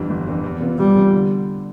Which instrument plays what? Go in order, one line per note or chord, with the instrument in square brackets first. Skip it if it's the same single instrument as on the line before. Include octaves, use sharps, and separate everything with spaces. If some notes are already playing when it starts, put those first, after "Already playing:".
Already playing: [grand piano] G1 F2 E3 G3 D4
G1
F2 E3 G3 D4
E2
C3 E3 B3 F4
[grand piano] E2 [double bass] G3
[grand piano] C3 E3 B3 F4
D3